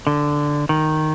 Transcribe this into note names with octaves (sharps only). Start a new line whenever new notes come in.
D3
D#3